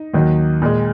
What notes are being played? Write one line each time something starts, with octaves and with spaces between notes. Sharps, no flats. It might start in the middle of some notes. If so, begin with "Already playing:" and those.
Already playing: D#4
D#2 D#3 F#3
A#2 G#3